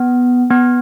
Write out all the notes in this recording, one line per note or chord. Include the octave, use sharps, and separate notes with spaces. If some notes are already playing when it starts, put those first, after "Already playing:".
Already playing: B3
B3